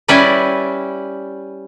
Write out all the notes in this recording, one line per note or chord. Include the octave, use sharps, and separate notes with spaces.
G3 C#4 E4 B4 D5